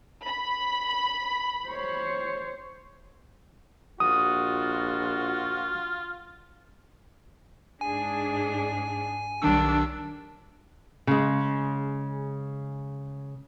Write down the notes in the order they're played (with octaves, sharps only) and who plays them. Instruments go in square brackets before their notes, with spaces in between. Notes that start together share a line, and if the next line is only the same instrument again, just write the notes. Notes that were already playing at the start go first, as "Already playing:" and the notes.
[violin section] B5
[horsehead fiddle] C5 C#5
[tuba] A#1 [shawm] F4 [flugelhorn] F#4 [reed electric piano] D#6
[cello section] G#2 D4 G#4 [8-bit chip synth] G#5
[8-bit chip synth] B1 D#3 E6 [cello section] G3 [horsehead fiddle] D4
[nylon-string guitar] C#3 G#3